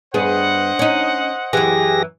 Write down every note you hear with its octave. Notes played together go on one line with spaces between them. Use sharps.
G2 B3 G#4 C5 D#5 F#5
C#4 D#4
F#2 E3 G4 G#4 A#6